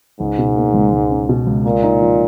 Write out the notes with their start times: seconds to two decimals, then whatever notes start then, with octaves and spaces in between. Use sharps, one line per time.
0.20 C#2 G#2
0.38 B2
0.56 A#3
0.74 C#2
0.93 C#2
1.11 C#4
1.29 B2
1.47 C#2
1.65 A#2 A#3
1.83 D#4
2.02 F3